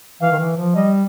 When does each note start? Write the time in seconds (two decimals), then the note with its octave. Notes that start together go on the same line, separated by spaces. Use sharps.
0.22 E3 F5
0.31 D#3
0.40 E3
0.57 F3
0.75 G3 D#5